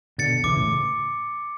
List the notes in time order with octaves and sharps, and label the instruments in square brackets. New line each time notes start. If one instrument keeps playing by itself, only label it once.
[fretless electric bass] B2 D3 [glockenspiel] A6 C#7
[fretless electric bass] D3
[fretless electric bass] C#3 E3 [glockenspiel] D6
[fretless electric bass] A2 C#3